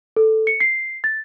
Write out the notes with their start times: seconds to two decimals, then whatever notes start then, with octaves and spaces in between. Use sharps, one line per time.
0.16 A4
0.47 C#7
0.60 C7
1.04 A6